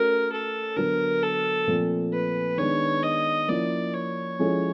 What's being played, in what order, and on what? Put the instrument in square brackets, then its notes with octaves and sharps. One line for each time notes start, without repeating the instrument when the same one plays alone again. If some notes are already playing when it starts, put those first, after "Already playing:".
Already playing: [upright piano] A3 C#4 F#4 [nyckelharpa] A#4
[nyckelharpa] A4
[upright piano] D3 F#3 B3 [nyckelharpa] A#4
[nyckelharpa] A4
[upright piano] A#2 F3 A3 C4
[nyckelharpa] B4
[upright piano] D#3 G#3 B3 D4 [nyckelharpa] C#5
[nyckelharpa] D#5
[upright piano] F3 A#3 C#4 E4 [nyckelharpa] D5
[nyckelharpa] C#5
[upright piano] F3 G#3 C#4 E4 A4